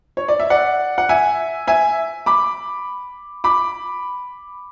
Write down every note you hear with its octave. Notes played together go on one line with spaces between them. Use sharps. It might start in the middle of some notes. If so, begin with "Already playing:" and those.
C#5
D5
E5
D5 F#5
F#5
E5 G#5
E5 G#5
B5 D6
B5 D6